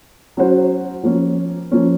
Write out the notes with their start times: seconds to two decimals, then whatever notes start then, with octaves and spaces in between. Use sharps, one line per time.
0.37 F#3 C#4 F#4 C5
1.03 F3 A#3 C#4
1.71 F3 A#3 C#4